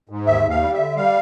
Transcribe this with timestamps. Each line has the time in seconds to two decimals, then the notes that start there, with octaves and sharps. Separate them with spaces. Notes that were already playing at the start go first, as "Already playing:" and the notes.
0.09 G#2
0.26 D#2 E5
0.44 D#2
0.50 F5
0.62 G3
0.73 E5
0.79 D3
0.96 G3 F5